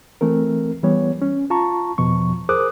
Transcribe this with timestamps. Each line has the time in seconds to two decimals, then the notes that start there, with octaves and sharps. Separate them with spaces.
0.21 E3 A3 C4 A#4
0.83 E3 G3 B3 C#5
1.22 C#4
1.50 F4 A5 A#5 C#6
1.98 E2 B2 F3 C#6
2.49 G#4 A#4 C5 D6 D#6 F#6